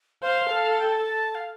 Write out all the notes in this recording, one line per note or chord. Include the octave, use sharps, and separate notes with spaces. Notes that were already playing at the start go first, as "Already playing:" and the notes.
C5 F5
A4
F5
G5
A5
F5